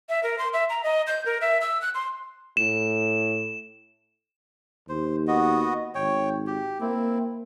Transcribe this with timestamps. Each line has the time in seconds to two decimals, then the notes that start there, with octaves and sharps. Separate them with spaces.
0.09 E5
0.23 A#4
0.38 C6
0.53 E5
0.70 A#5
0.84 D#5
1.07 G6
1.26 A#4
1.41 E5
1.61 E6
1.82 F#6
1.95 C6
2.57 A2 E7
4.89 D#2 C5
5.28 B3 F#4 D#5
5.95 G#1 C#5 G5
6.47 G4
6.81 A#3 C4 E4